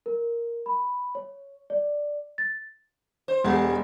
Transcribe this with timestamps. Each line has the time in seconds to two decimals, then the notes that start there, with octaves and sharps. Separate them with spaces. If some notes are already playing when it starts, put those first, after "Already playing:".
0.06 A#4
0.66 B5
1.15 C#5
1.70 D5
2.38 A6
3.28 C5
3.44 E1 G3